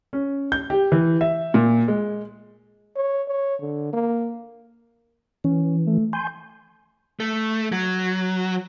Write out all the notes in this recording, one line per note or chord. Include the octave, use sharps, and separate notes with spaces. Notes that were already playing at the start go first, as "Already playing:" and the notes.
C#4
G6
G4
E3
E5
A#2
G#3
C#5
C#5
D3
A#3
E3 C#4
A3
G#5 C6 G6
A3
F#3